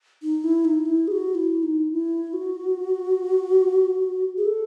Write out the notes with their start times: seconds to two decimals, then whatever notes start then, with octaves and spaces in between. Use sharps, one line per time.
0.23 D#4
0.44 E4
0.65 D#4
0.86 E4
1.08 G#4
1.12 F#4
1.35 E4
1.63 D#4
1.92 E4
2.33 F#4
4.37 G#4
4.45 A4